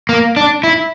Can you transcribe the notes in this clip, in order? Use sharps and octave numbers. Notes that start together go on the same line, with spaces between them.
A#3
D4
E4